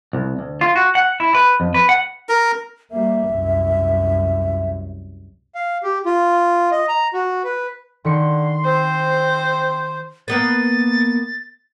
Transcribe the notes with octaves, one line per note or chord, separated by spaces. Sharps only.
C2
D2
F4
F#4
F#5
E4
B4
F2
B4
F#5
A#4
G3 A#3 E5
C2 F#2
F5
G4
F4
D#5
A#5
F#4
B4
D3 D#3 B5 C6 C#7
C4 C5
A#3 B3 B4 A6